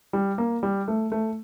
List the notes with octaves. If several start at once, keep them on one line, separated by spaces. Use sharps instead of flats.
G3
A#3
G3
A3
A3